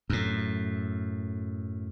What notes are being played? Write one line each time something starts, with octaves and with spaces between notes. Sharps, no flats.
F#2 A2